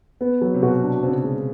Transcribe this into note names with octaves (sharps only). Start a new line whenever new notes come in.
B3
F#3
C3
B2 F#4
D4
C#3 C4
G#3